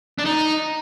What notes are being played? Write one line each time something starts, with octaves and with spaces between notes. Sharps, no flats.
D4
D#4